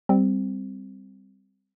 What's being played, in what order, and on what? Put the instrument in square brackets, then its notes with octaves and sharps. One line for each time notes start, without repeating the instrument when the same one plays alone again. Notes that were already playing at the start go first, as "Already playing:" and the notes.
[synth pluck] G3 C4